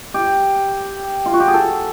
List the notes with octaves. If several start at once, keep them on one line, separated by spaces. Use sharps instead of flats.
G4
F4
F#4
G4
G#4
A4